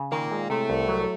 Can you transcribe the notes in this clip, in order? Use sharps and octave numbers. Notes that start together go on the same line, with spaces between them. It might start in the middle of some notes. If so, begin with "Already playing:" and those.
Already playing: C#3
A#2 D#3 A#3
G#3
A2 C3 A3
C2
F#3